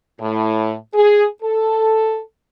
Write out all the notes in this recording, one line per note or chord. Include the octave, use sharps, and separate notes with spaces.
A2
G#4
A4